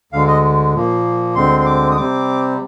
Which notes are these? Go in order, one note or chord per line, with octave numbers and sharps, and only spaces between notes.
D2 D3 G#3 F5
D#5
A#2 F3 A#3
D2 D3 G#3 C4 C6
C6
D6
D#6
C3 G3 C4 D6